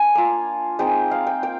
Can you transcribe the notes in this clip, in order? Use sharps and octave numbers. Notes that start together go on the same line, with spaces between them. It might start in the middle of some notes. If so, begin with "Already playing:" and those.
Already playing: D4 G#5
A#3 F4
G#3 C4 D#4 G5
F5
G5
A#3 G5